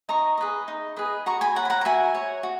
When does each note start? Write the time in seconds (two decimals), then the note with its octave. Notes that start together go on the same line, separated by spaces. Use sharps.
0.09 D#4 A#5 C#6
0.38 G#4 B4 D#5
0.68 D#4
0.96 G#4 B4 D#5
1.26 F#4 A#5 C#6
1.41 G#5 B5
1.55 C#5 F#5 A#5
1.65 B5
1.70 F#5 A#5
1.81 A#5
1.85 F#4 E5 G#5
2.15 C#5
2.43 F#4